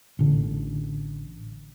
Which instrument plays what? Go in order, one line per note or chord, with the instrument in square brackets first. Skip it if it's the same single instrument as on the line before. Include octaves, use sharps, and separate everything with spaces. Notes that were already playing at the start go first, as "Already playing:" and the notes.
[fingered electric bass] A1 D3